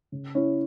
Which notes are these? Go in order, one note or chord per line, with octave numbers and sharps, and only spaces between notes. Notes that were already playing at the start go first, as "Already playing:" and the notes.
C#3
C#4 E4